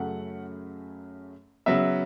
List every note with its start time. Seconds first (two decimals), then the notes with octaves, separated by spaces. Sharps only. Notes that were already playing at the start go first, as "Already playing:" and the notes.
Already playing: F#2 C#3 F#3 A3 F#5
1.66 C#3 F#3 B3 E5